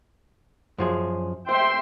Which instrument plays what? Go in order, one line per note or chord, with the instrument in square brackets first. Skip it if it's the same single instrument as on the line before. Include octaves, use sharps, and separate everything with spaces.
[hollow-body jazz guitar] F#2 F3 G#4
[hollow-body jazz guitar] C5 [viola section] E5 G5 C6